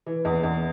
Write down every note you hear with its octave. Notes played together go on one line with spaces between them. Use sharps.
E3
E2
E2